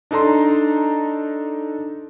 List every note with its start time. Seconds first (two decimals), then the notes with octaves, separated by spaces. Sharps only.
0.11 D4 D#4 A4 A#5 C6